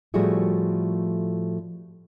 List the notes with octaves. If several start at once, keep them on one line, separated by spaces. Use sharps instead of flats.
A2 F3 G3 A3 F#4 G#4